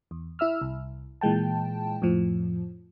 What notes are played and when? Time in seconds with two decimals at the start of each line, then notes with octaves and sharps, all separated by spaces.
0.11 E2
0.39 E4 E5 E6 F6
0.61 C2
1.21 A#2 E3 G#3 G5 A5
2.02 F2 A2 F3